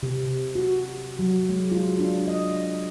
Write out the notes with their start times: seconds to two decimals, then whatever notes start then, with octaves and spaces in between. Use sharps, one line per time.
0.03 C3
0.55 F#4
1.19 F#3
1.49 G#3
1.72 F4
1.99 D4
2.28 D#5